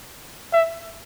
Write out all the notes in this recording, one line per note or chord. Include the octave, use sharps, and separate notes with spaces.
E5